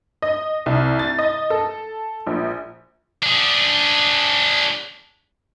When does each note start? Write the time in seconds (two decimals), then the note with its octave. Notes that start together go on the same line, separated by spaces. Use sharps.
0.22 D#5
0.66 C2
0.99 A6
1.19 D#5
1.50 A4
2.27 A#1
3.23 D4 G#4